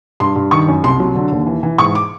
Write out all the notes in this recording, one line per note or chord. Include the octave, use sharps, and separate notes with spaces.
G2 C6
G2
D#3 C#6
F#2
C2 C6
F#3
D3
D#2
E3
E3
G#2 C#6
D6